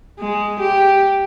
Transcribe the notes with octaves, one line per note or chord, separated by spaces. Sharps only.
G#3
G4